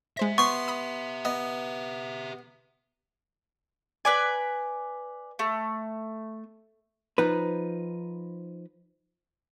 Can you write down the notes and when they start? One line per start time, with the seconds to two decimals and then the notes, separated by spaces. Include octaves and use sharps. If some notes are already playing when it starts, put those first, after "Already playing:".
0.17 G#3 G4 C5 E5 A#6
0.38 B3 C6 C#6
0.68 B5 D#6
1.25 B3 D#5
4.05 B4 D5 G#5
5.39 A3
7.18 F3 D#4 B4